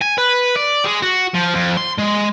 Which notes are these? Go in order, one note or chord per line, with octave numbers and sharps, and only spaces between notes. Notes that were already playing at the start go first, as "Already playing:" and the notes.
G#5
B4
D5
G#3
F#4
F3
F2
C6
G#3